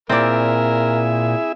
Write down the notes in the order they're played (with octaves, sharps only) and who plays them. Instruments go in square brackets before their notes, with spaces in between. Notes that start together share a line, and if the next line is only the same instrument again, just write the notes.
[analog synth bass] A#2 [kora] C4 D5 [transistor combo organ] E4 G#4 E5 [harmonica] A#4